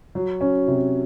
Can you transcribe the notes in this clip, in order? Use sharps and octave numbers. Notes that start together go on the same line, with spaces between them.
F#3
C#4
C3